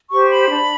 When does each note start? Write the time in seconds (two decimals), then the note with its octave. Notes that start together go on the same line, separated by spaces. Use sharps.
0.11 G4 C5 C#6
0.31 B5
0.50 D4